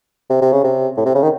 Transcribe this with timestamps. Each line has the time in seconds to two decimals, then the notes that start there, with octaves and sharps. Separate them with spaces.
0.30 C3
0.41 C3
0.52 C#3
0.64 C3
0.97 A2
1.06 C3
1.15 C#3
1.22 D#3